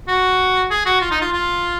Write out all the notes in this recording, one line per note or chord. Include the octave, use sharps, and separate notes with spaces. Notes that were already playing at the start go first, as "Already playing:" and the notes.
F#4
G#4
F#4
F4
D#4
F4
F4